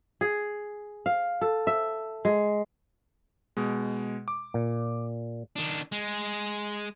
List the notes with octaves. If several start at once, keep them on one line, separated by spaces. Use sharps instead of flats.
G#4
F5
A4
E5
G#3
B2 G#3
D6
A#2
D#3 D4
G#3